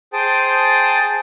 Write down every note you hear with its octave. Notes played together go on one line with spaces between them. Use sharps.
G#4 C5 G5 A5 D#6